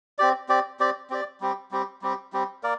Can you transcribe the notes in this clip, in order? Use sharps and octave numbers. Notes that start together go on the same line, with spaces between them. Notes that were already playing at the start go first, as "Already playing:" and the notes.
C4 G4 D5
C4 G4 D5
C4 G4 D5
C4 G4 D5
G3 C4 G4
G3 C4 G4
G3 C4 G4
G3 C4 G4
A#3 A#4 D5